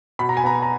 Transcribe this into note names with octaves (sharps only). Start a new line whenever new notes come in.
B2 B5
A#5
G#5
B3 A#5
A#5